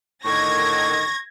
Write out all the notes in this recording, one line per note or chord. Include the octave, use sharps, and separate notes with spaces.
A2 D3 D#3 C#6 G#6 A#6